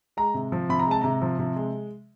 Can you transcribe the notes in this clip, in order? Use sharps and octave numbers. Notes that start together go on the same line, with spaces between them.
G#3 A#5
C3
F3
C3 B5
A#5
G#3 A5
C3 A#5
F3
C3
G#3